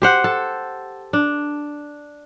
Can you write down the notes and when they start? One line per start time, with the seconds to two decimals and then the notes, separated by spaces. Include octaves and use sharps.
0.02 G4 C5 F#5
0.24 A4
1.13 D4